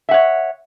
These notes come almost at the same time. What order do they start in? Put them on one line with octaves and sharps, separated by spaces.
E5 F#5 C#5